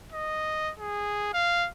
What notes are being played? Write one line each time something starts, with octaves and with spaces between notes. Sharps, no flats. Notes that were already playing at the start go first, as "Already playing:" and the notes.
D#5
G#4
F5